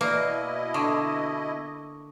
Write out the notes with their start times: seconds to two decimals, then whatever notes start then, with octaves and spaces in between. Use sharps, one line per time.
0.01 B2 A#3 E4 B4 D5 D#5
0.74 D3 C#6 D#6